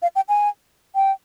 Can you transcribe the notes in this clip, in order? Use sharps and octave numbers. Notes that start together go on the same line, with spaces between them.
F5
G5
G#5
G5